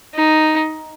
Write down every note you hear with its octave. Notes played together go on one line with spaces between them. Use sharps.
D#4